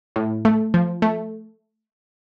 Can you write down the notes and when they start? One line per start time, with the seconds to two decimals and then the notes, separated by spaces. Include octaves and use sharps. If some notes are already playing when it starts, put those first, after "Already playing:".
0.16 A2
0.45 A3
0.74 F3
1.02 A3